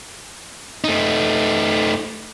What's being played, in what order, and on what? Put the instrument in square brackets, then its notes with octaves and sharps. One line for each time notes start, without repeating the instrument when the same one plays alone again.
[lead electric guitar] A3 D#4